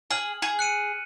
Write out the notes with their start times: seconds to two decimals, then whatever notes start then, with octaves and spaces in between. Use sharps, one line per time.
0.11 G#4 F6 F#7
0.42 G#4
0.59 F#6 C#7 D#7